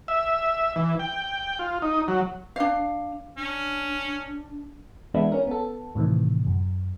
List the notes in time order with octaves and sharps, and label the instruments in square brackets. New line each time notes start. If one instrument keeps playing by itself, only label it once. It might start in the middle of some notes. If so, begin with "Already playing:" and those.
[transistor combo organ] E5
E3
G5
F4
D#4
F#3
[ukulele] D4 F5
[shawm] C#4 [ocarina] D4
[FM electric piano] E3 G#3 B3 D4 E4
C#4 A#4
B3 A4
A2 C3 D#3 E3
F#2